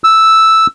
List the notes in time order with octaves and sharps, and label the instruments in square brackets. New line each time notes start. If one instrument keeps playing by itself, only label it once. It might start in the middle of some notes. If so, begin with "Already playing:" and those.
[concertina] E6